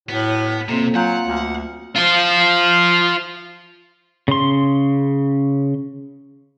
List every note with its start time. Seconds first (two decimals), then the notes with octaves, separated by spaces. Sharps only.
0.09 A2 F#3 B3
0.69 F2 C3 A#3 C4
0.95 F#3 F4 F#5 G#5 A#5 G6
1.27 D2
1.96 F4 C5
4.28 C#3 C6